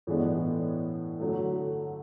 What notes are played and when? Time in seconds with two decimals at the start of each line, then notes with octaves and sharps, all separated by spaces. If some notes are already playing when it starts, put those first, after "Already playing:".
0.07 A2 E3 G#3 B3 D4
1.20 D3 F#3 A3